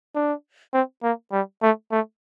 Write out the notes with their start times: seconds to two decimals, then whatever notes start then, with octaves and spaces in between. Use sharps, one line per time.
0.15 D4
0.73 C4
1.03 A#3
1.32 G3
1.62 A3
1.92 A3